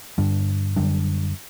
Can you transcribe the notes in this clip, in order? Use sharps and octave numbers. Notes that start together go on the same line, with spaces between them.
G2 D3 G3 D4
F#2 D3 G3 D4